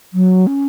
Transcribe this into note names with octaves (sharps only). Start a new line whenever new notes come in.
F#3
C#4